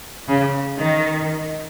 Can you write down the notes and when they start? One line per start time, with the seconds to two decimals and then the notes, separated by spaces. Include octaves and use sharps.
0.28 C#3
0.77 D#3